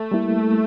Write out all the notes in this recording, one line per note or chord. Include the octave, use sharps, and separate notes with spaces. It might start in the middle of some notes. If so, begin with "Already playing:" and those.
Already playing: A3
G3 A#3 E4